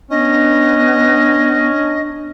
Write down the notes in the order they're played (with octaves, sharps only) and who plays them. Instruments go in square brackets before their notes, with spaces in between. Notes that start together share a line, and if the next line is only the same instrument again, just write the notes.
[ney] B3 [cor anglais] C#4 [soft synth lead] D4 [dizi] D#5